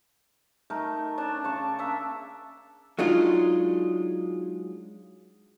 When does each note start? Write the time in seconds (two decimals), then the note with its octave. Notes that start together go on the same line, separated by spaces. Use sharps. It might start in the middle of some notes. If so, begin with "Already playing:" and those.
0.70 A3 D#4 A#4
1.17 C#4 D4 A5
1.44 C#3 A5 C#6
1.79 A#3 D4 E5
2.99 F#3 G#3 D4 D#4 F4